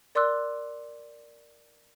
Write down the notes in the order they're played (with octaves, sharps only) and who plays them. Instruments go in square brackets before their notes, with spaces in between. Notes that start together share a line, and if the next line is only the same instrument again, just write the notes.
[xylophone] A#4 D5 C6 D6 E6 F#6